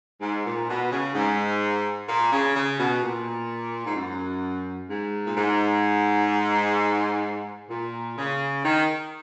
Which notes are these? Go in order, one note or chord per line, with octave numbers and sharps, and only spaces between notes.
G#2
A#2
B2
C#3
G#2
A#2
C#3
C#3
B2
A#2
G#2
F#2
G#2
A#2
G#2
A#2
C#3
D#3